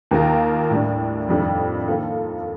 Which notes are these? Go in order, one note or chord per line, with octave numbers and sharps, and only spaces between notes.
D#2 D#3 A#3 F4 A#4
A2 G3 D4
F2 D#3 G3 D4 A4
D#3 A#3 F4 A4